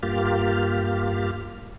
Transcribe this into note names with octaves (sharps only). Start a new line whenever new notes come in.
G2 A#3 F4 G4 F6